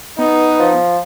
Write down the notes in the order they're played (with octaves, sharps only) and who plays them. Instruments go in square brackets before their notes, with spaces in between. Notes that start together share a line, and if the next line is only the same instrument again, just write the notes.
[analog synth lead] B3 [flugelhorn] D#4
[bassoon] F3